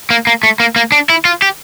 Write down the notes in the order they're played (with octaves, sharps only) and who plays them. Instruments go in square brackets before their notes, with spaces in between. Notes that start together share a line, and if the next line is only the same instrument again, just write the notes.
[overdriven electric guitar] A#3
A#3
A3
A#3
A#3
D4
E4
F4
G4